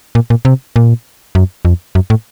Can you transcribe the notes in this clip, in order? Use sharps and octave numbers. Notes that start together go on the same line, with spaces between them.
A#2
A#2
C3
A#2
F#2
F2
F#2
A2